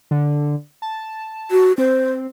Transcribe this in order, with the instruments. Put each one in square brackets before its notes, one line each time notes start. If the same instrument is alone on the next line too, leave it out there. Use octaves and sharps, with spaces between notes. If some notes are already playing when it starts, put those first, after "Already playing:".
[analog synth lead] D3
A5
[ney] F#4
[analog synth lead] C4 [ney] C5